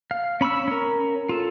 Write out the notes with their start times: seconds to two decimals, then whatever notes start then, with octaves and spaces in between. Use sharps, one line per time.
0.11 F5
0.41 C#4 B5 C#6 E6
0.68 C#4 A#4
1.29 F4 A4